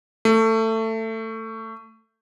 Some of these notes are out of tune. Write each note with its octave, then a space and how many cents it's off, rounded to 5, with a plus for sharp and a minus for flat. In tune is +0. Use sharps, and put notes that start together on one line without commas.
A3 +20